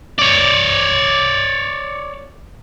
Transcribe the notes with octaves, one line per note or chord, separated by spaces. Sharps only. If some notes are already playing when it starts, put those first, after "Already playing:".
C#5 D5